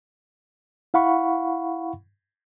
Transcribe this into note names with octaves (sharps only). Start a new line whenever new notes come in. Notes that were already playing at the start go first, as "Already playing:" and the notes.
E4 F5 F#5 B5 C#6